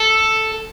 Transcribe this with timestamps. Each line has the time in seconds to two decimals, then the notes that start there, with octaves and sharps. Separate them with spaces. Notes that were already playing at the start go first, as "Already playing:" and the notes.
Already playing: A4